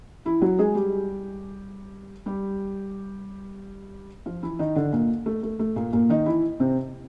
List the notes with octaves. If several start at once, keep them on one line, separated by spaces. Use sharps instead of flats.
E3 E4
F#3 F#4
G#3 G#4
G3 G4
G3 G4
F3 F4
E3 E4
D#3 D#4
D3 D4
A#2 A#3
A3
A3
A3
A#2 A#3
A#2 A#3
D#3 D#4
E3 E4
C3 C4